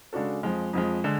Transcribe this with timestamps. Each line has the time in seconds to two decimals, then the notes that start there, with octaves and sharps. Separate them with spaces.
0.13 C#3 G#3 D4 F#4 A4
0.43 F2 F3 G#3
0.73 F2 F3 G#3
1.04 D3 G#3